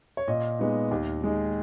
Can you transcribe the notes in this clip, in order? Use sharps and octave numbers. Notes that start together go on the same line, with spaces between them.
C#5
A#2 D#5
G#3 B3 D#4
D#2
D#3 G#3 D#4